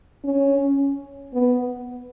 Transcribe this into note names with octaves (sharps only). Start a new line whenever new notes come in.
C#4
B3